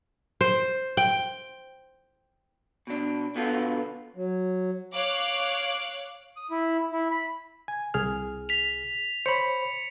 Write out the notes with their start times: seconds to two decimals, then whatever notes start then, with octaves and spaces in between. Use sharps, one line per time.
0.41 C5
0.97 G5
2.87 B2 D4
3.35 B2 D3 B3 F4 A4
4.16 F#3
4.93 C#5 F5 D6 F#6
6.37 D#6
6.51 E4
6.92 E4
7.11 B5
7.68 G#5
7.94 C2 G#4 F6
8.49 B6 F7
9.26 C5 C#5 B5 C#7